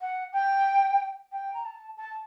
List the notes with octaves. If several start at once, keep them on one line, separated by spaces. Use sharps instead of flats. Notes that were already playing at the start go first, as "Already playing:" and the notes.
F#5
G5
G5
A#5
A5
A5